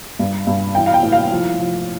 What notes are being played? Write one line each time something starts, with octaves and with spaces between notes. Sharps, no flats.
G2
G2
E3 G5
F5
G5
A2
F5
F3
F3